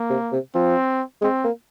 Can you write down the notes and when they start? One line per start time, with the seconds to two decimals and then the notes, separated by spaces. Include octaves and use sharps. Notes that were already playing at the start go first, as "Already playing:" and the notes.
Already playing: A#3
0.10 C3
0.32 C3
0.55 F3 C4
1.21 G#3 C4
1.44 A#3